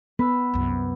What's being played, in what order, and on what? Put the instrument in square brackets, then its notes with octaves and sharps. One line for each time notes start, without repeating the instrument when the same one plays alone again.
[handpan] B3 [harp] B4 E6
[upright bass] C2 F#2